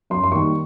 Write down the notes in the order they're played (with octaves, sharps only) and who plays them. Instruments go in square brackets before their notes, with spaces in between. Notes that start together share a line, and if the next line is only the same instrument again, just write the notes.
[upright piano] F#2 C6
C6
D#3 G3 A#3 C#6